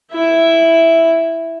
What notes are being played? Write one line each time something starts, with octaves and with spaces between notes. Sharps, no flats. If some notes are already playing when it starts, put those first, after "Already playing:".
E4 E5